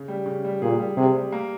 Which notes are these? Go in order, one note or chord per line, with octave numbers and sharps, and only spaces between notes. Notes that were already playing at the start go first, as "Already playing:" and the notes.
Already playing: C#3
G3
C#3
G3
A#2 G#4
G3
C3 G#4
G3
A#3